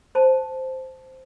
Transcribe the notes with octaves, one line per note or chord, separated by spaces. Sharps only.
C5 A5